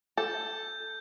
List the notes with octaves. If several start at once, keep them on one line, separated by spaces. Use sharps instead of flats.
A4 G6